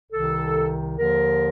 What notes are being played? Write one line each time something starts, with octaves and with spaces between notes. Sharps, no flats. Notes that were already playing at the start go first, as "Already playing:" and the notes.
C2 C3 D#3 A4
D#2 D3 F3 A#4